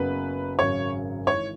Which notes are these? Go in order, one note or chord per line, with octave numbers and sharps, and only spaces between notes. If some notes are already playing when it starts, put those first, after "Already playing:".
Already playing: F#1 F#2 C#3 F#3 B3 B4
G#1 F#2 C#3 F#3 C#4 C#5
G#1 G#2 E3 C#5